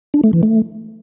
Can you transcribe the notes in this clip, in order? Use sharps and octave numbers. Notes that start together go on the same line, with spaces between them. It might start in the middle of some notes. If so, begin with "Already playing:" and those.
D4
A3
E3
A3